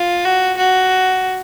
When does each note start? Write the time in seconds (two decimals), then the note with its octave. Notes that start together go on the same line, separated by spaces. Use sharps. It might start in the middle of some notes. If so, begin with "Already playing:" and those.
Already playing: F4
0.24 F#4
0.57 F#4